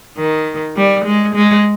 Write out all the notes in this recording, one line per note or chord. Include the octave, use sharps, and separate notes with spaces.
D#3
G3
G#3
G#3